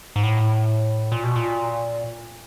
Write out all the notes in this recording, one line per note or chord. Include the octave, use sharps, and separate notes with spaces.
G#2
A2
A#2
B2
A#2